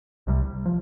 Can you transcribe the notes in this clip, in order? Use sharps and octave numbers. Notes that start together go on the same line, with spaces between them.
C2 C3 G3
F3